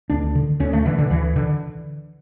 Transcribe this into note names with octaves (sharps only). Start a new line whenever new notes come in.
D2 D4
D3
D2 C#4
A3
D3 E3
D3
D2 E3
D3